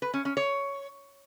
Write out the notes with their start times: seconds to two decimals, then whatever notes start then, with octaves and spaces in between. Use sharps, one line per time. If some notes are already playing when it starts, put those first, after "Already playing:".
0.02 B4
0.14 C#4
0.25 C#4
0.37 C#5